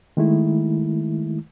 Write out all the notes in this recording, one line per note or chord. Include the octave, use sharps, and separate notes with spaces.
D#3 G#3 A3 E4